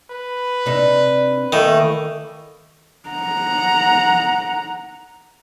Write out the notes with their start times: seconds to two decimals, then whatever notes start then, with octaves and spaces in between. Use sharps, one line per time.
0.11 B4
0.66 C3 D4 D#4
1.53 D#3 E3 A3 A#3
3.09 F#5 A#5